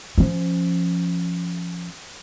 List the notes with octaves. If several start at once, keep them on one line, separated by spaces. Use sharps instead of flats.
F3 C#4